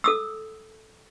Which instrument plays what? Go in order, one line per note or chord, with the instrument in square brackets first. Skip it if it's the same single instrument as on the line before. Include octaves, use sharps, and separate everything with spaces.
[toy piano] A4 D#6 E6